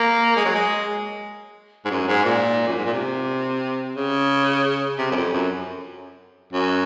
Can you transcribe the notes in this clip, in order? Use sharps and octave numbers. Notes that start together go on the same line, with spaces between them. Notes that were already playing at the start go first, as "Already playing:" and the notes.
Already playing: A#3
G#3
F#3
G#3
G#2
F#2
G#2
A#2
F#2
G#2
A#2
C3
C#3
C3
F#2
F2
F#2
F#2